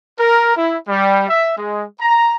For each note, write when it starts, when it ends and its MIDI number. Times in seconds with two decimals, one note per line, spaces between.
0.18 0.55 70
0.56 0.76 64
0.88 1.25 55
1.28 1.56 76
1.57 1.85 56
2.00 2.35 82